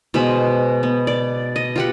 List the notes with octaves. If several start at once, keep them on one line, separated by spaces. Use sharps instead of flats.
B2 G#3 C5 B5
B3
D5
D#5
F4 G4 F#5